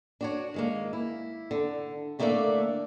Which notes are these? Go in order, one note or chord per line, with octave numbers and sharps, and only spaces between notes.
D4 F#4 C#5
D#3 G#3 A#3
E4
D3
A2 D3 A3 A#3 D5 E5